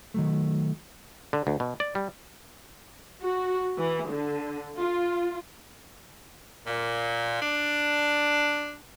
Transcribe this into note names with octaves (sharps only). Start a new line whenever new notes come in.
D#3 F#3 A3
D3
D2
B2
D5
G3
F#4
E3
D3
F4
A#2
D4